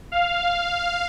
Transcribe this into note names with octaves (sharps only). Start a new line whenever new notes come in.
F5